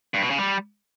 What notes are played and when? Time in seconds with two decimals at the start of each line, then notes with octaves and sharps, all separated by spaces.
0.14 G2
0.22 B2
0.30 C#3
0.38 G3